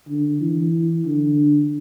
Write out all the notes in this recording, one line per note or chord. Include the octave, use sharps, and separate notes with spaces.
D3
E3
D3